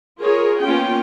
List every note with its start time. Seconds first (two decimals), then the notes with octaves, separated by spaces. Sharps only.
0.20 F4 G#4 A#4 C#5
0.63 A#3 B3 C#4 F4 G5